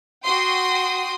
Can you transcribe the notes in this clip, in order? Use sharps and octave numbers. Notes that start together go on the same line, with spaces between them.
F#4 G5 C6 D#6